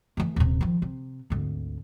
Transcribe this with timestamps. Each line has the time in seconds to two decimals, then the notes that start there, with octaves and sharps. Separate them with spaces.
0.17 E3 A3
0.36 D#1 C3
0.61 D#3 F3
0.82 C3
1.30 G#1 D2